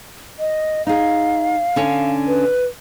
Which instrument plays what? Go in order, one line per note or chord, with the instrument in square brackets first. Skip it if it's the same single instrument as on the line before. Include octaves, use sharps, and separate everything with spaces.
[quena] D#5
[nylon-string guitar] D#4 G#4 [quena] F5
[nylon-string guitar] D3 C#4 G#5
[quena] B4